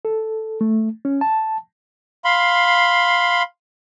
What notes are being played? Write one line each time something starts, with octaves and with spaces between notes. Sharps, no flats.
A4
A3
C#4
A5
F5 B5 C6